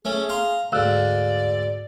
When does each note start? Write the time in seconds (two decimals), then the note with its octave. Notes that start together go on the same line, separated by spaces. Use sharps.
0.05 A3 C#4 G#4
0.29 F5 A#5 C6
0.72 D2 G#2 D5 F5 E6 F#6